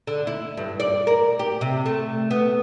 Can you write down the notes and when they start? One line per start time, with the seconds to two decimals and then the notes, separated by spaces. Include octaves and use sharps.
0.07 D3
0.27 E4
0.57 G2
0.80 D5
1.07 A#4
1.39 G4
1.61 C3
1.86 A3
2.31 B3